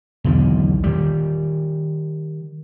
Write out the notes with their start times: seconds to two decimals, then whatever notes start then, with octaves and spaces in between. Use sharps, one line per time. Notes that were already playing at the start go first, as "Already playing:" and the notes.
0.24 B1 E2 D3 D#3
0.84 D#3 G3